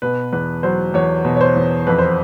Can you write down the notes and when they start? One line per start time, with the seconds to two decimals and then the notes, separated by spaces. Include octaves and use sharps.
0.02 B2 B4
0.33 E2 B4
0.63 F#3 C5
0.94 E2 C#5
1.25 B2
1.36 C#5
1.41 C5
1.56 E2
1.87 F2 B4
1.99 C5